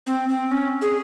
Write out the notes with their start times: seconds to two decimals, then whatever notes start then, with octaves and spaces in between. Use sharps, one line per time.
0.07 C4
0.29 C4
0.51 C#4
0.82 G#4